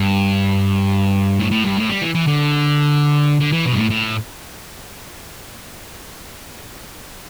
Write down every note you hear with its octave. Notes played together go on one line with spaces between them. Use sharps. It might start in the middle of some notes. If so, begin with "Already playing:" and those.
Already playing: G2
A2
A2
G2
A2
G3
E3
E3
D3
D3
E3
B2
G2
A2
A2